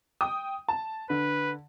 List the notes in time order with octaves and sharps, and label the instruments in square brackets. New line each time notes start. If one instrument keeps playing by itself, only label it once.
[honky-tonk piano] G5 D#6
A5
[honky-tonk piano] D3 [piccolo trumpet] B4